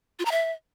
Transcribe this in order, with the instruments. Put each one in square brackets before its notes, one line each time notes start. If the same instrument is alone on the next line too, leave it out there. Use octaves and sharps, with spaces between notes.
[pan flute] F4
A#5
E5